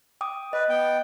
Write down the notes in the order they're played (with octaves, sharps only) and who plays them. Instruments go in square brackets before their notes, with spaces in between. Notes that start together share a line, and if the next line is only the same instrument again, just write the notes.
[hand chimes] G5 D6 D#6
[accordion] B4 [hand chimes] D#5
[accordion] B3 G5